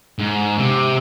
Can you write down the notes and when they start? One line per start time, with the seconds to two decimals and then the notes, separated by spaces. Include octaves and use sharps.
0.19 G#2
0.59 C3